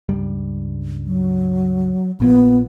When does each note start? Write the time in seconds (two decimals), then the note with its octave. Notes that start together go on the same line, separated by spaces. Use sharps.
0.09 C#2 G2 G3
1.07 F#3
2.20 A#1 A#2 F3 B3